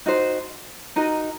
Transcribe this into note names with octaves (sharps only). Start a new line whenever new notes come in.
D#4 F#4 C5
D#4 F#4 A#4 D#5